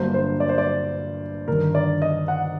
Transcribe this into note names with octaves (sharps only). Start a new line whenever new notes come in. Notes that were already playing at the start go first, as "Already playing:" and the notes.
Already playing: G1 G2 F#3 A#3 C5
C5
D5
C5
D5
G1 G2 D#3 A#4
D5
D#5
F#5